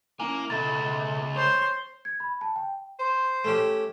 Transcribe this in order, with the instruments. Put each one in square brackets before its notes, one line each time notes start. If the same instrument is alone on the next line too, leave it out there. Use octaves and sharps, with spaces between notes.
[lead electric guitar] A#3 [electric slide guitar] C#4 E4 G#5
[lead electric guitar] C#2 [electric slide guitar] B2 A4 E5 [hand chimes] A6
[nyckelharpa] C5 C6 [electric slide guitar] C#5
[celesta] G#6
B5
A5
G5
[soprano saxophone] C5
[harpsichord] A3 C#4 G4